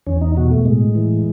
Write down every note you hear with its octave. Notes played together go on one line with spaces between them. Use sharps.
E2 C#4
D#4
B2 F#4
A3
A2 G#3
E3